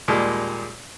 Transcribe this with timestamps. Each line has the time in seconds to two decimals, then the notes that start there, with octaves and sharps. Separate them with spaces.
0.08 D#2 A#2 G3 G#3